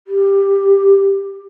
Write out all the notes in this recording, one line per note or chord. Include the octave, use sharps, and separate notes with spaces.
G4